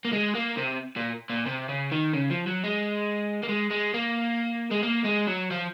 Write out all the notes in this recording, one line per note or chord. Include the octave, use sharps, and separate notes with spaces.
A#3
G#3
A#3
C3
A#2
A#2
C3
C#3
D#3
C#3
F3
F#3
G#3
A#3
G#3
G#3
A#3
G#3
A#3
G#3
F#3
F3